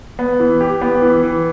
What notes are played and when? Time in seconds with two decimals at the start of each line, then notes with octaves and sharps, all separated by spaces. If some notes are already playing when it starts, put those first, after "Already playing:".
0.19 B3
0.40 E3
0.61 G4
0.82 B3
1.02 E3
1.23 E3